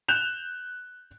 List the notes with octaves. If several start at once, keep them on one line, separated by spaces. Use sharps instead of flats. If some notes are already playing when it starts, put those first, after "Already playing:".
F#6 G6 E7 F7